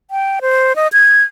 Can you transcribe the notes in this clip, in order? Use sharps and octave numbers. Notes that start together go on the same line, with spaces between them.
G5
C5
D#5
G#6